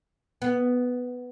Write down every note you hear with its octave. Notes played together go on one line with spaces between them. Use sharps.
B3